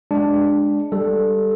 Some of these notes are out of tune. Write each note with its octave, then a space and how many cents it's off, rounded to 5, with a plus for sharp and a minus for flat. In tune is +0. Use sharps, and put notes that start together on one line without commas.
G#3 +0 D4 +0
G3 +0 A4 +0